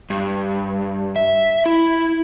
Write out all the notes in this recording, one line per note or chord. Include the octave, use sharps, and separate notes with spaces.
G2
E5
E4